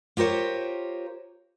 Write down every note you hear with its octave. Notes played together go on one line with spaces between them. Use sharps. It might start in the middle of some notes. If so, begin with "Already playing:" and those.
F4 G4 A#4 C5 C#5